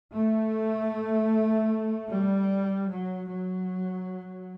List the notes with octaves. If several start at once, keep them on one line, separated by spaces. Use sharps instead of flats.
A3
G3
F#3
F#3